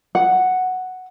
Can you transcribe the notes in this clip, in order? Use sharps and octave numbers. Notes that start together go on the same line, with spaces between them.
F#5